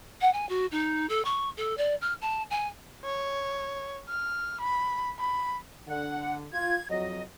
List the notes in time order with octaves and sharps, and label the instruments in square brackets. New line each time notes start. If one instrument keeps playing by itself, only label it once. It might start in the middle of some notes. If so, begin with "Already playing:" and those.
[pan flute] F#5
G#5
F#4
D#4
A4
C#6
A4
D5
F6
A5
G#5
[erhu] C#5
F6
B5
B5
[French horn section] D3 [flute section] F#5
[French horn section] F4 [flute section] G#6
[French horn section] F2 F#3 [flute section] D#5